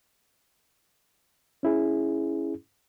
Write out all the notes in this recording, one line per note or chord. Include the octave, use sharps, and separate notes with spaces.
C#4 E4 G#4